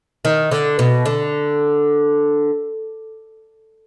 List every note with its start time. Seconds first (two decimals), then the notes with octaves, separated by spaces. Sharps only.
0.25 D#3
0.51 D3
0.79 B2
1.06 D3